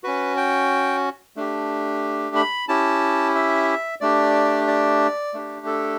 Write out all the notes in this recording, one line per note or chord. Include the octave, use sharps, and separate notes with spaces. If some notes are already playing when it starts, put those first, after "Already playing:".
C#4 F#4 B4
G5
A3 D4 G4
B5
C#4 E4 G4 A5
E5
A3 D4 G4 D5
D5
A3 D4 G4
A4